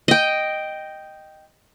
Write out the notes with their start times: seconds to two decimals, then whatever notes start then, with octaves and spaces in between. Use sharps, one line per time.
0.08 D#5 G5